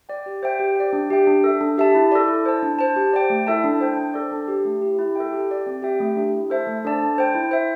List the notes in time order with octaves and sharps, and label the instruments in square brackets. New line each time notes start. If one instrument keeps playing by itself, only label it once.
[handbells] D5 G5
G4
C5 E5 G5
G4
D5 G5
D4
G4 E5 G5
D4
A4 E5
D4
G4 E5 A5
E4
A4 D5
E4
C5 A5
D4
C5 A5
G4
D5 G5
A3
E4 A4 E5 A5
D4
C5 G5
D4
A4 D5
D4
G4 C5
A3
E4 G4
E4
A4 E5 G5
G4
D5 G5
C4
G4 E5 G5
A3
D4 G4
E4
A4 C5 E5 A5
A3
D4 A4 D5 A5
D4
C5 G5
E4
C5 E5